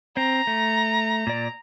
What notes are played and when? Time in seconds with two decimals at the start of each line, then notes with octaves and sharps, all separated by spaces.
0.17 C4 A#5
0.47 A3
1.27 A#2 D5